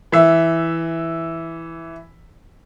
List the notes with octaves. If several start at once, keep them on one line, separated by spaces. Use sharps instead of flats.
E3 E5